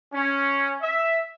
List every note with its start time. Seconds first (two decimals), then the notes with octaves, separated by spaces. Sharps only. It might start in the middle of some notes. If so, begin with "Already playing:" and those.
0.14 C#4
0.82 E5